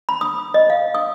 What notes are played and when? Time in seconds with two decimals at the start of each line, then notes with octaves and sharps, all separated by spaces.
0.09 B5
0.21 D#6
0.54 D#5
0.70 F5
0.95 D#6